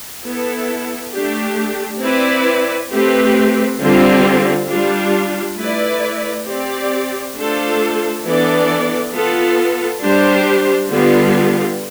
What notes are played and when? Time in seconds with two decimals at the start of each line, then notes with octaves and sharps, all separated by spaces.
0.24 B3 E4 A4
1.13 A3 D4 G4
2.02 C4 E4 B4 D5
2.91 A3 C4 G4 B4
3.79 D3 G3 C4 F4
4.68 G3 D4 F4
5.57 A3 E4 B4 D5
6.46 C4 G4 D5
7.35 A3 D4 F4 A4 C5
8.24 E3 B3 D4 A4 D5
9.13 B3 F4 A4
10.01 G3 D4 G4 C5
10.90 D3 G3 B3 F4